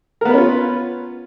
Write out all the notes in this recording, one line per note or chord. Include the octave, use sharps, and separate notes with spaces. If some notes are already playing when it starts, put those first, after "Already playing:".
B3 C#4 F4 A#4 B4